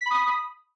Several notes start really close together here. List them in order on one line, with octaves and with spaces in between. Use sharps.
B6 B5 D#6